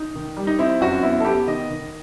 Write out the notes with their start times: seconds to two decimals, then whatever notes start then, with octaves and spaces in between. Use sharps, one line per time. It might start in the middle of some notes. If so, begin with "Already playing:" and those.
Already playing: D#4
0.15 D#3
0.37 G3
0.47 D#4
0.59 C4 E4
0.81 F#2 F#4
1.03 B3 E4
1.20 A4
1.25 B3 G4
1.47 D#3 D#5
1.70 D#3